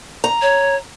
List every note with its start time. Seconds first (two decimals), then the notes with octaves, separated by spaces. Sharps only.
0.24 A#5
0.42 C#5